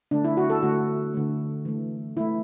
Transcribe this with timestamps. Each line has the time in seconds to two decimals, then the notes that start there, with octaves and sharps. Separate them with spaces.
0.11 D3 A3 D4
0.24 E4
0.37 F#4
0.50 A4
0.62 D3 A3 F#4
1.14 D3 A3
1.65 E3 A3
2.17 E3 A3 E4